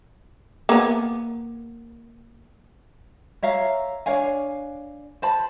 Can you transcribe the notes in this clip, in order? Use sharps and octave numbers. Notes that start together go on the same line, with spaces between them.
A#3 B3
C#5 E5 F5 A#5
D4 C#5 F5 G#5
C5 A5 B5